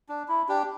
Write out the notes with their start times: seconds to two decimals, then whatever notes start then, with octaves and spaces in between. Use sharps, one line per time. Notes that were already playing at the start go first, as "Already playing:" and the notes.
0.09 D4
0.28 E4
0.48 D4 G4